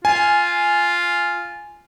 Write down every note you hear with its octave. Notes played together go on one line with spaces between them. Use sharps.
F4 G#5